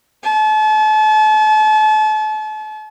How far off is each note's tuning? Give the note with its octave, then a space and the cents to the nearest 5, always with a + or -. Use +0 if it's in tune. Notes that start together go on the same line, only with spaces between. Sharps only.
A5 -40